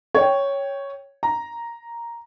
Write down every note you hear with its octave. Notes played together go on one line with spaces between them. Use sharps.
C#5 G5
A#5